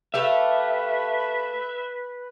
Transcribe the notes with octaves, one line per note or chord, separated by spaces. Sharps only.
A3 G4 B4 E5 F5